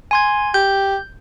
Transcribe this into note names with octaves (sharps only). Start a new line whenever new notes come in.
G#5 C6 G#6
G4 G6